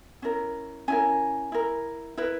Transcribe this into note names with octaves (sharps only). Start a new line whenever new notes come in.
C#4 E4 A#4
C#4 E4 A#4 G#5
E4 A#4
E4 A#4 B4